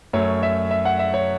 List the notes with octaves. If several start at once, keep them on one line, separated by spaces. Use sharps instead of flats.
F#2 F#3 A3 C#5
E5
E5
F#5
E5
C#5